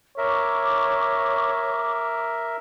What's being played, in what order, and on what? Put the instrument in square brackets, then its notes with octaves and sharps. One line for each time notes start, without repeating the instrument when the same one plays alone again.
[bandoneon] A#4 E5 [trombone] C#5 [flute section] D6